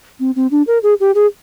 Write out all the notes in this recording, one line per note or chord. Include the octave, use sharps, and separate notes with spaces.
C4
C4
D4
A#4
G#4
G4
G#4